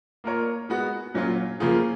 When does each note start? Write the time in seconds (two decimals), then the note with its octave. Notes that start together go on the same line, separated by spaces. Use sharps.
0.24 A#3 F4 A#4 C#5
0.69 G#3 B3 F#4
1.14 A#2 F#3 C#4 F4
1.60 C#3 F3 A#3 F4 G#4